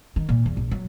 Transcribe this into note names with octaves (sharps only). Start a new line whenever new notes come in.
D#3
A#2
E2
A#1
F#3